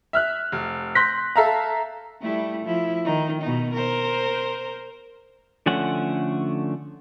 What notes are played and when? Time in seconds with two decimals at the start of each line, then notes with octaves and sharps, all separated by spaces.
0.13 E5 F6 F#6
0.52 F1
0.95 C6 F#6 G6 A#6 B6
1.36 A4 E5 F5 A#5
2.22 G3 A3 E4
2.65 F3 E4
3.05 D#3 D#4
3.42 B2 D#4
3.74 A#4 C5
5.66 D3 F3 A3 C#4 F#5